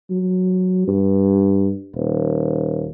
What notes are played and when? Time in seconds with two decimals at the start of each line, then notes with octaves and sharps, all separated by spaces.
0.10 F#3
0.87 G2
1.95 D#1